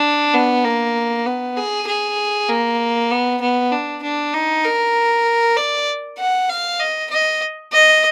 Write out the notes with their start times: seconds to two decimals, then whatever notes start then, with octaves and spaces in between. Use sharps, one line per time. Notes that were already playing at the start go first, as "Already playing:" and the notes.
Already playing: D4
0.34 B3
0.65 A#3
1.26 B3
1.57 G#4
1.88 G#4
2.49 A#3
3.11 B3
3.41 B3
3.72 D4
4.03 D4
4.33 D#4
4.64 A#4
5.57 D5
6.18 F#5
6.49 F5
6.80 D#5
7.10 D#5
7.72 D#5